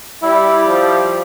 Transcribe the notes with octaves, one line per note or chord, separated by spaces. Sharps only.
G3 E4
F3